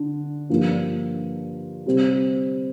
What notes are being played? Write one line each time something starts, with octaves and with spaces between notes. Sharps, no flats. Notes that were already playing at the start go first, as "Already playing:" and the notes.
Already playing: D3 D4
G2 F3 A#3 D4 F4
C3 G3 C4